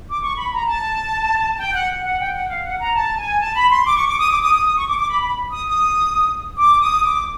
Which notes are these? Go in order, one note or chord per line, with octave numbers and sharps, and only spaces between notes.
D6
C#6
B5
A#5
A5
G5
F#5
F#5
G5
F#5
F5
F#5
A#5
A5
G#5
A5
B5
C6
D6
C#6
D6
D#6
D6
D#6
D#6
D#6
C#6
D6
D6
B5
B5
D#6
D#6
D6
D#6
D6